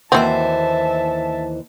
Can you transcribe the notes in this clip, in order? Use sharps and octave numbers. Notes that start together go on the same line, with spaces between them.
D#2 E3 C4 E4 F#4 C5 E5 A5